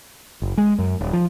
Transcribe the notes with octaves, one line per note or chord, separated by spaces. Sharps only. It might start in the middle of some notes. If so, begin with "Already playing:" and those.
F#1
G#3
F#2
D#1
F3